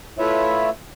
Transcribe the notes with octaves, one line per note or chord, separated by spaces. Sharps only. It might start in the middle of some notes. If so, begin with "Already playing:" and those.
A3 E4 F4 B4 C#5 E5